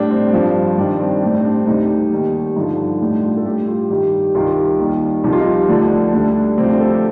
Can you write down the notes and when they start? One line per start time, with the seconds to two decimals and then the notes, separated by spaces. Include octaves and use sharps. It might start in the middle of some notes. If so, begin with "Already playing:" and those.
Already playing: A2 G3 D4
0.11 C4
0.33 G2 F3 C4
0.77 G2 D#3 G3 D4
1.00 C4
1.22 A2 G3 D4
1.40 C4
1.45 D4
1.67 D2 C3 G3 D#4
2.12 D#2 D#3 G3
2.56 G2 D3 F3 D#4
3.00 A2 G3 D4
3.23 F4
3.37 A4
3.45 A2 G3 G4
3.68 F4
3.90 G2 D#3 G3 G4
4.35 C2 C3 D#3 F4
4.79 D#2 D#3 G3
5.24 C2 C3 F3 D#4
5.32 F4
5.41 D#4
5.68 D2 D3 F3 D4
6.13 D2 D3 G3
6.58 D2 C3 F3 C4
6.69 D4
6.80 A4
6.91 G4